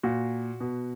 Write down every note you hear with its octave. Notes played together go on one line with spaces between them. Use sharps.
A#2 F#4
B2